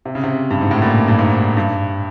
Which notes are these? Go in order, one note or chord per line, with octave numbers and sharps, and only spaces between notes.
C3
C#3
C3
G2
G#2
A2
A#2
G2
G#2
G2